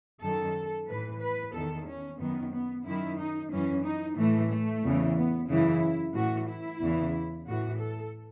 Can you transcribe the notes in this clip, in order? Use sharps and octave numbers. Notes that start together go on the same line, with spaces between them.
F#2 D#3 A4
A2 E3 B4
B4
E2 D#3 A4
C#4
F#2 D#3 B3
B3
F#2 D#3 E4
D#4
F#2 E3 C#4
D#4
A2 E3 A3
A3
E2 C#3 E3
B3
F#2 C#3 E3 E4
A2 E3 F#4
E4
E2 C#3 E3
A2 E3 F#4
A4